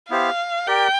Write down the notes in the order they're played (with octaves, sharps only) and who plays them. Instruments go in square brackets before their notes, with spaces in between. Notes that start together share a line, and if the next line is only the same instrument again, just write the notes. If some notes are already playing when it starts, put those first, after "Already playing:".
[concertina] B3 E4 G4 C5 [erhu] F5
[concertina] G4 A#4 D5 [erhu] G5